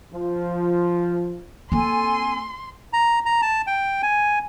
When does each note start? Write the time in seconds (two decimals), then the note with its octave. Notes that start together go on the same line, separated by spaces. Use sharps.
0.12 F3
1.72 A#3 C4 A4 G#5 C6
2.93 A#5
3.26 A#5
3.42 A5
3.67 G5
4.03 G#5